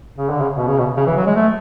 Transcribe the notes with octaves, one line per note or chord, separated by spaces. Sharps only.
C#3
D3
C#3
B2
C#3
B2
C#3
E3
F#3
G#3
A3